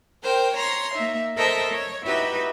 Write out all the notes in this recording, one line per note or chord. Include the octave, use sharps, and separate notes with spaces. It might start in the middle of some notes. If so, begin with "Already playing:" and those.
A#4 C5 G5
C#5 A#5 C6
A#3 D#4 E5
A4 A#4 C5 D#5 E5 A5
C#5
D#4 E4 F#4 G4 B4 E5